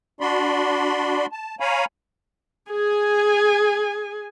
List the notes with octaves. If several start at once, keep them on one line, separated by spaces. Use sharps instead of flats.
D4 F#4 D5 B5 C6
A5
C#5 F5 G#5 A#5 B5
G#4 G#5